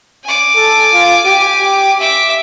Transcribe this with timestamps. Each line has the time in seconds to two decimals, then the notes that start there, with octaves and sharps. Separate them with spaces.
0.24 G#5 D6
0.56 A4
0.93 F4
1.25 G4
1.98 E5 D6